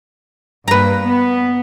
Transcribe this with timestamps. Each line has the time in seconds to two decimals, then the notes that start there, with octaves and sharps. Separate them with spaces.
0.68 G2 A#3 B4 A#5
1.06 B3